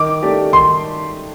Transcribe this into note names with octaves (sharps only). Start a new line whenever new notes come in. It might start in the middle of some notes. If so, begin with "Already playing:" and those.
Already playing: D#3 D6
A3 D#4 G4 D5
D#3 C6